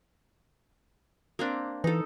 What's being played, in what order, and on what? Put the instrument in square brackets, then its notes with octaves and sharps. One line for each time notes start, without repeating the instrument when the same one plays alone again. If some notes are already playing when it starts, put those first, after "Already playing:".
[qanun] A#3 C4 D4
[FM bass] E3 [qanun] D#4 A4